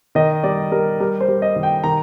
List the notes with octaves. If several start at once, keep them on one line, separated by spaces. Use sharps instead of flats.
D#3 D#5
G3 D5
G3 A#4
G3 A#4
C5
G3
D#5
D#3
G5
D#3 A#5